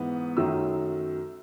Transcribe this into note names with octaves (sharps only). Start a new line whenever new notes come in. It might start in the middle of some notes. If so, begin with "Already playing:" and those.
Already playing: G#2 E3 B3
F#2 D#3 F#3 A3 E6